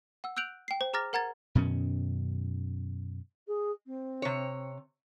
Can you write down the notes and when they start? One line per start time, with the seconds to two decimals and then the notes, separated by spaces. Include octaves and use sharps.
0.24 F#5 E6
0.37 E6 F#6 G6 D7 F7 F#7
0.68 G5 C7
0.81 C5
0.93 G#4 A#5 D6 F6 A6 A#6
1.13 A#4 F#5 A#5 G#6 A6
1.55 F#2 B2 D#3 C#4
3.47 G#4
3.86 C4
4.22 C3 C#5